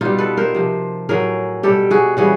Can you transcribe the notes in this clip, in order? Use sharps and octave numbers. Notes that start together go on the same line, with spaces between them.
B2 G3 D#4 F4
A4 B4
A#4 C5
C3 F3
A2 F#3 G#4 A#4
B2 G3 G4 A4
F#4 G#4
C#3 E3 G3 F#4 G#4